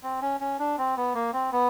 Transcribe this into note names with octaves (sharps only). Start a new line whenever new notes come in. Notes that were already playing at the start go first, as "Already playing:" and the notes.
C4
C#4
C#4
D4
C4
B3
A#3
C4
B3